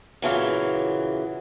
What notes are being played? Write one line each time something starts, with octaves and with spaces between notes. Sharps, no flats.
A#2 C#3 E3 F#3